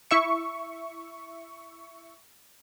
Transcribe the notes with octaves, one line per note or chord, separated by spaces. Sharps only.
E4 E5 C#6